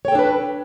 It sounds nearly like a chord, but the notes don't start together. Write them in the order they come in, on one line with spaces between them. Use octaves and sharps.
C#5 G5 A4 D4 B4